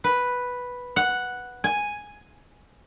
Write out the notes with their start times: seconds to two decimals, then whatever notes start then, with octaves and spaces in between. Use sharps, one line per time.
0.04 B4
0.96 F#5
1.64 G#5